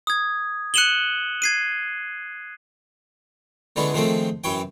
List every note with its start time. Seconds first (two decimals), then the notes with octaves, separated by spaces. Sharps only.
0.07 D#6 G#6
0.74 F#6 C#7 D#7 E7 F#7 G7
1.42 G#6 C7 D#7
3.76 D3 E3 G#3 B3 C#4
3.94 D#3 F3 G#3 A3 C4
4.44 F#2 E3 C#5 G5